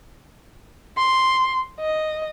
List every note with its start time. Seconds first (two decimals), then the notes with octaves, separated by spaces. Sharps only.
0.97 C6
1.80 D#5